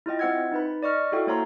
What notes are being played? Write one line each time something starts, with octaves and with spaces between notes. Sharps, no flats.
E4 F4 D#5 G5
C4 C5 E5 F#5 E6 G#6
D#4 B4 B5
D5 D#5 C#6 F6
E4 F#4 A4 E5 G5
A#3 C5 C#5 E5 A#5 C6